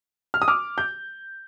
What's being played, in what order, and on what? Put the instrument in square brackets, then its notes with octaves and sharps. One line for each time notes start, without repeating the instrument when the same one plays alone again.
[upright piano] F6
D#6
D6 F6
G6